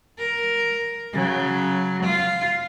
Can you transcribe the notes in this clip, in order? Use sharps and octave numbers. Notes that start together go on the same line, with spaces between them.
A#4
C#3 F#3
F4